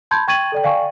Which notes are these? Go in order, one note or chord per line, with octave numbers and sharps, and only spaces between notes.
A5 B5 C6 G6 G#6
G5 C#6 G#6 A6 D#7 F#7
A4 D5 G5
D5 F5 G5 G#5 C#6